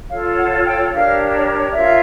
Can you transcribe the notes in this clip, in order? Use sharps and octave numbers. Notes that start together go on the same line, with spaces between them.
F4 A4 C#5 F5
F#5
G5
D4 G4 A#4 C#5 F5
F4 A#4 C#5 E5